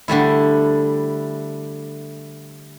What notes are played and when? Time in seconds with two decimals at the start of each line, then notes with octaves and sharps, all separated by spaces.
0.08 D3 G3 A3 E4